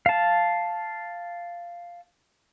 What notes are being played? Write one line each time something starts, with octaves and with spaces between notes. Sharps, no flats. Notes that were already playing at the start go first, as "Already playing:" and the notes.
F5 A5